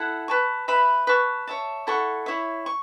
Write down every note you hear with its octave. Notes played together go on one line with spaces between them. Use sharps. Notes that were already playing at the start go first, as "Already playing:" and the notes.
Already playing: E4 A4 F#5
B4 A5 C#6
B4 E5 B5
B4 A5 C#6
C#5 E5 A5
E4 A4 F#5 C#6
E4 C#5 E5
C#6